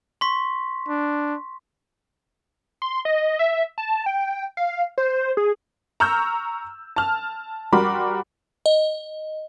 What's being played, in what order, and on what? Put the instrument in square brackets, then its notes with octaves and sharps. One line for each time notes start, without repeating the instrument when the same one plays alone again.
[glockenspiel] C6 C#6 B6
[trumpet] D4
[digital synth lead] C6
D#5
E5
A5
G5
F5
C5
G#4
[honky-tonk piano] A#5 C#6 E6 F6 G6
A5 F6
G3 F#4 A#4 B5 C6 D6
[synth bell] D#5